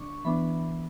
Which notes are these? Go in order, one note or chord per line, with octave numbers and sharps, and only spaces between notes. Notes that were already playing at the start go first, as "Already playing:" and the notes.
Already playing: D3 D4 C#6 D6
E3 B3 D4 B5